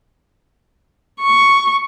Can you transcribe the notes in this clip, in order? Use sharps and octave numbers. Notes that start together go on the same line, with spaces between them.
C#6